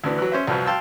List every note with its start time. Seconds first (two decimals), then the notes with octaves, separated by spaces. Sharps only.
0.04 D2 D3 E3
0.18 E3 F#3
0.32 C#4 C5 E5
0.47 C2 F#2 F3 B4
0.66 F5 G5 A5 C6 E6